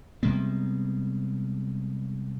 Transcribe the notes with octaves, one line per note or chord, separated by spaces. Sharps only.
C3 G3 G#3 B3